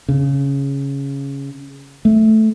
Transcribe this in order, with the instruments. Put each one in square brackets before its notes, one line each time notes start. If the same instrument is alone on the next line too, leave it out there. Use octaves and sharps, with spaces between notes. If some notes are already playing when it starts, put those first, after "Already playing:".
[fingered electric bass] C#3
A3